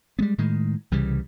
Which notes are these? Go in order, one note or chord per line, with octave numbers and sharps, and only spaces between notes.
G3 G#3 B3
A2 D#3 G#3
C2 C#3 E3 G3